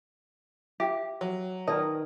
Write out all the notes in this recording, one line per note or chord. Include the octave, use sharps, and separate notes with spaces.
G4 E5 F5
F#3
D#3 B4 D5 D#5 A5